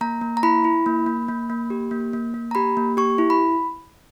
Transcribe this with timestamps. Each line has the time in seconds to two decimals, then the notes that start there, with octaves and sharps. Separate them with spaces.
0.01 A#3 A#5
0.21 A#3
0.37 A#5
0.43 E4 B5
0.64 E4
0.86 A#3
1.06 A#3
1.28 A#3
1.50 A#3
1.70 G4
1.91 A#3
2.13 A#3
2.34 A#3
2.51 A#5
2.55 G4 B5
2.77 A#3
2.97 G4 C#6
3.18 E4
3.30 B5